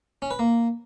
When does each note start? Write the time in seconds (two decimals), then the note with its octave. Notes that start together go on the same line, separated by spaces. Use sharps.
0.22 C#4
0.31 B4
0.39 A#3